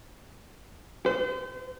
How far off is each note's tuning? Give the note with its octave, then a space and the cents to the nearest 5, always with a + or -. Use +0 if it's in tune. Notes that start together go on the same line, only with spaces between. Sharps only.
C5 -35